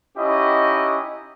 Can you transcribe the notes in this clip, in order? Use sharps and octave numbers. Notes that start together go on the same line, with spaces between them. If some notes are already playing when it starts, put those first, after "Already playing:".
C#4 D#4 E4 F#4 G4 D#5